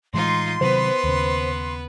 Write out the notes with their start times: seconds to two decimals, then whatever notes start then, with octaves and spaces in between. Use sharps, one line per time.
0.14 A2 E3 G#3 D#4 F4 C6
0.61 C3 D#3 F#3 B3 B4 C5
1.04 D#2 C#3